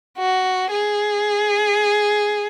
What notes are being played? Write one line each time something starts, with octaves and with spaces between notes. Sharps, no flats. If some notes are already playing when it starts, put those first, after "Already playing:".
F#4
G#4